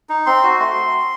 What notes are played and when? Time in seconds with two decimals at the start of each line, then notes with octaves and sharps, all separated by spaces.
0.09 D#4
0.26 C4 C6
0.43 F#4
0.60 A3 C6